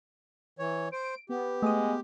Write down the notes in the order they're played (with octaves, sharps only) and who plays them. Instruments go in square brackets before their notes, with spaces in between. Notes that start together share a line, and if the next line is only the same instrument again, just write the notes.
[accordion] E3 C#5
[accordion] C5 [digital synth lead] D7
[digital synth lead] B3 [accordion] G4
[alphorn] G#3 [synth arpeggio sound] A3 D#6